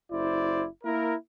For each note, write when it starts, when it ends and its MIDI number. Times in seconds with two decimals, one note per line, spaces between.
0.11 0.65 30
0.11 0.65 64
0.11 0.65 72
0.11 0.65 74
0.84 1.14 58
0.84 1.14 64
0.84 1.14 70